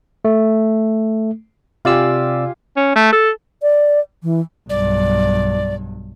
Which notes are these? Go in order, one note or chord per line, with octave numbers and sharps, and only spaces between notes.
A3
C3 F4 G4 D5 G#5 E6
C#4
A3
A4
D5
E3
B1 G2 D5